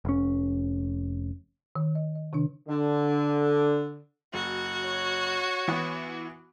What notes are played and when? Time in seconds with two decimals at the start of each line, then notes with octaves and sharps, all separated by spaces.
0.05 F1 C#4
1.76 D#3
1.95 D#5
2.15 D#5
2.33 C3 D#3 D4
2.68 D3
4.34 F#1 F#4
4.85 C#5
5.68 E3 B3